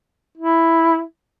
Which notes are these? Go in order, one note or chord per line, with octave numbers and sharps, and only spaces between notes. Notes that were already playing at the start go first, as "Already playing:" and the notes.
E4